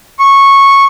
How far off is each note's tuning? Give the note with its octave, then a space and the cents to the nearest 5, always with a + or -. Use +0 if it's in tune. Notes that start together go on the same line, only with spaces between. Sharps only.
C#6 -10